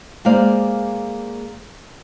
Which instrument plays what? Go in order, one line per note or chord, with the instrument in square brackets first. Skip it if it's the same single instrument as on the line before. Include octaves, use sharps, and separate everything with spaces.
[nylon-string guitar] G#3 A#3 C5 D5 F5